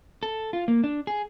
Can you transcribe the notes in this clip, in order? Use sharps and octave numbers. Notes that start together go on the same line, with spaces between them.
A4
F4
A#3
D4
G#4